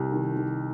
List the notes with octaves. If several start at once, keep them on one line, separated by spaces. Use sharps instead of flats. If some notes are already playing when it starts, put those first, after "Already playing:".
Already playing: C2 C3
D#3
D#3